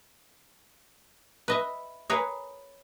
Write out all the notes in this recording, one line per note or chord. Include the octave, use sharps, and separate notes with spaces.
B4 D#5 E5
G#4 A#4 B4 C#5